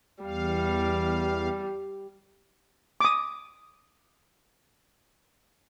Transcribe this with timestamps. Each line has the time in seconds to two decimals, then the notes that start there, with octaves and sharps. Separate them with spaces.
0.23 E2 G3 F5
3.01 D6 D#6